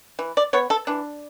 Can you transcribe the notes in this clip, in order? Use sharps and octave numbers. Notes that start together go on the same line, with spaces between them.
E3
D5
B3 C#5
A4
E3 D4